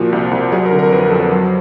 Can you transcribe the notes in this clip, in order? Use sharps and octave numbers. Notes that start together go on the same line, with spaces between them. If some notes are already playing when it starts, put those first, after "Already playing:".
Already playing: A#2 F3 F#4
C2
C2
F#3 G#4
A#4
D3
A#4
F2 B4
A#4
F2 A4
A#4
F#3